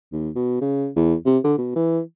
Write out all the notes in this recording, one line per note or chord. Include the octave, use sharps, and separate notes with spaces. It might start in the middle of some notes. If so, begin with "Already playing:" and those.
D#2
B2
C#3
E2
C3
D3
B2
E3